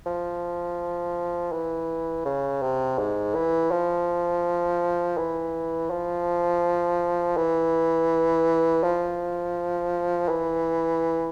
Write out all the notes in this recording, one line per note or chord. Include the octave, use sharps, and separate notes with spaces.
F3
E3
C#3
C3
G#2
E3
F3
E3
F3
E3
F3
E3